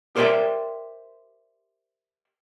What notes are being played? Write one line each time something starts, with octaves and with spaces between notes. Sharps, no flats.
G4 A#4 C5 D5 E5 G5